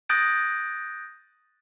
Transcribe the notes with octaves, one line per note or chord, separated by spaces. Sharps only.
D#6 F#6 G6 A6 A#6 D7